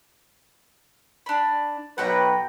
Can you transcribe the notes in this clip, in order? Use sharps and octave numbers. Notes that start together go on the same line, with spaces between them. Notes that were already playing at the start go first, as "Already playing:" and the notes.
D4 B5
B1 F#3 B4 F#5 G5 A#5